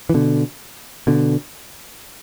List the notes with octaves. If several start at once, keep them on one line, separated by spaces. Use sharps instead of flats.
E3
B2 D3
B2 D3